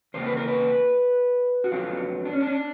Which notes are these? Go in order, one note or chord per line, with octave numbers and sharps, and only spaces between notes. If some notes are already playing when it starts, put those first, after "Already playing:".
E2 C#3 A#3 C5
B4
A#4
B4
F#4
F2 D3 F#3 B3 F4
D4
C#4
D4
C#4
D4